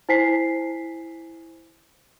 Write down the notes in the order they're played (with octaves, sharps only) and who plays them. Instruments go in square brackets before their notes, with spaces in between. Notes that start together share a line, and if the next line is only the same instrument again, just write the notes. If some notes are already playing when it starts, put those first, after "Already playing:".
[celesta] E4 C5 G#5 B6 C7